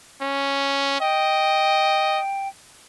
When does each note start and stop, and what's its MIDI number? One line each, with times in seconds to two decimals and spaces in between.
0.21 0.97 61
1.00 2.19 75
1.00 2.48 79